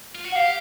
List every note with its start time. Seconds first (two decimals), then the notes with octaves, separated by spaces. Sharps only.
0.15 F4
0.25 F#4
0.32 F#5
0.36 G4 F5